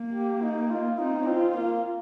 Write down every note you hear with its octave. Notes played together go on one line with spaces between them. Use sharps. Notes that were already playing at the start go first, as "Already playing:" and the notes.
Already playing: A#3
G4
D#4
F4
C4 D#4
C4 F4
A#3